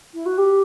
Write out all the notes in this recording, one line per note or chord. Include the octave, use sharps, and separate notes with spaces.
E4
F#4
G4